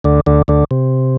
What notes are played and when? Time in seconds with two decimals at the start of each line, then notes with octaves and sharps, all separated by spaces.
0.04 D2 D3
0.26 D2 D3
0.48 D2 D3
0.71 C3